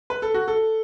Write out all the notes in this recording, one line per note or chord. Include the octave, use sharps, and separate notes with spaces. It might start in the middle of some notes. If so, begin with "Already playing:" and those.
B4
A4
F#4
A4